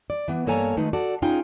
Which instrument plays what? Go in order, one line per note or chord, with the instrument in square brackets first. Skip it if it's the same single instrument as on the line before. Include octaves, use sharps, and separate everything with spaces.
[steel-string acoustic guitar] D5
E3 B3
G2 A#3 A4 C#5 G#5 A#5
D#3 F3 G#3 A3 D#4 B4
F#4 A4 D5
C#4 D#4 F4 G#4 G5